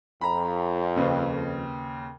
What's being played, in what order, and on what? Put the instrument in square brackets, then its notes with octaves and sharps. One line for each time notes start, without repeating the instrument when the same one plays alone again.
[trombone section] F2 [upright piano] A#5 B5
[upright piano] D#2 C#3 B4